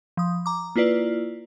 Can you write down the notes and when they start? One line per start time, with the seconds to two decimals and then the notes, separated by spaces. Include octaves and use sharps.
0.17 F3 D#6
0.46 A#5 D6
0.76 A#3 E4 F4 B4 D5